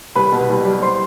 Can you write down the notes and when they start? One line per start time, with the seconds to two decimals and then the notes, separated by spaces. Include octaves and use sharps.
0.15 C2 B4 B5
0.32 B2
0.49 C2
0.65 G3
0.82 C5 C6